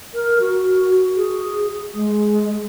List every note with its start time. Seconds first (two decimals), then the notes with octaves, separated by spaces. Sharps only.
0.14 A#4
0.40 F#4
1.17 G#4
1.94 G#3